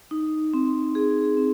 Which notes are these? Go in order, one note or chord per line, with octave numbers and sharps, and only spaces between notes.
D#4
C4
G#4
C4